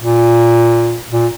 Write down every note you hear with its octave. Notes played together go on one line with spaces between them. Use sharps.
A#2
A#2